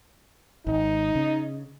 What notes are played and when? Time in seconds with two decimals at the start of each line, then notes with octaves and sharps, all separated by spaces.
0.67 G#1 D#4
1.15 C#3